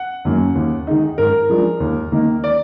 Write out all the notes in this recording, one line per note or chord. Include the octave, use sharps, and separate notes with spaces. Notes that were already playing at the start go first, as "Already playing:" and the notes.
Already playing: F#5
F#2 D#3 A#3
D#2
D#3 G#3 D#4
G#2 A#4
F3 G#3 D4
D#2
D#3 A#3 D#4
D5